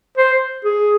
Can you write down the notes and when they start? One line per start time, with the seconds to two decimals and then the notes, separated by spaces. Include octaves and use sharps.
0.18 C5
0.64 G#4